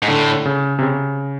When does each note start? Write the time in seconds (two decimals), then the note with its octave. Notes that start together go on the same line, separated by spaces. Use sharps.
0.02 G#2
0.08 A2 D3
0.45 C#3
0.79 C3
0.82 C#3